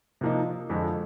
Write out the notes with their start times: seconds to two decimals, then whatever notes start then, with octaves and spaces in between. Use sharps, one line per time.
0.21 C3 F3 A#3 D#4
0.69 F2 D3 F3 G#3